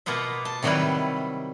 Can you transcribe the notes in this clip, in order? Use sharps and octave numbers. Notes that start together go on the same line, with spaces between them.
B2 A#3 B3 F4 E5
A5
C3 D#3 F#3 G3 E4 B4